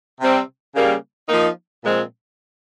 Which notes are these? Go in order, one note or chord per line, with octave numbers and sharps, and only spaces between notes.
C3 G3 C4
C#3 G3 A#3
F3 A#3 D#4
A#2 F3 G#3 C4